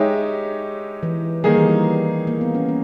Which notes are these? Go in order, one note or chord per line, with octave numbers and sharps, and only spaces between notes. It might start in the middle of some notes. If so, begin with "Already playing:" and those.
Already playing: G#3 D#4 G4 C#5 E5
E3
D#3 G3 A#3 D#4 G#4
E3
G3
A#3
B3
C#4
C#4